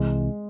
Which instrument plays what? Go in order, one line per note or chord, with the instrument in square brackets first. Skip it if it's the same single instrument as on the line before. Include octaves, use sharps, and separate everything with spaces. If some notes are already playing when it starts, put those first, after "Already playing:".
Already playing: [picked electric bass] C2 C3 E3 [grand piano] G#3